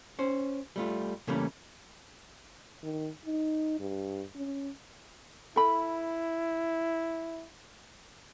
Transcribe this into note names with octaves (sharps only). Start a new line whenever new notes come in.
C#4 C5
G3 A3 F4
C#3 E3 G3 A3 A#3 C#4
D#3
D#4
G2
C#4
E4 A4 B5